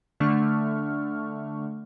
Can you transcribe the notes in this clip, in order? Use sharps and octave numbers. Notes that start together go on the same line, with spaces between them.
D3 A3 D4 C#6 F6